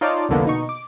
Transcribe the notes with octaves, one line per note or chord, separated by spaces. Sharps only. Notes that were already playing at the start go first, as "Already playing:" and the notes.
D#4 F4 C#5 D5 A5 D6
C2 F2 D3 A#3 B3
B2 D#4 C#6
D6